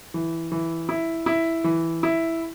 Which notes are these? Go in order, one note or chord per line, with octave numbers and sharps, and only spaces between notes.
E3
E3
E4
E4
E3
E4